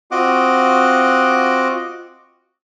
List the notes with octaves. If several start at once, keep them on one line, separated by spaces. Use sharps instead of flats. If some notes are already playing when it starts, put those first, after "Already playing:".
C4 F4 F#4 D#5 F#5 D6